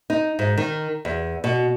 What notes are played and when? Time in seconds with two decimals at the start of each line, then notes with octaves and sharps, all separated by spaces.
0.10 D#4
0.39 G#2
0.57 D#3
1.05 E2
1.44 B2